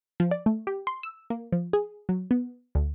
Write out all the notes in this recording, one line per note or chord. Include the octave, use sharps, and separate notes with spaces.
F3
D5
A3
G4
C6
E6
A#3
F3
G#4
F#3
B3
D2